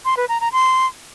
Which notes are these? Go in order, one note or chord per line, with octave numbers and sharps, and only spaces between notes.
C6
B4
A#5
A#5
C6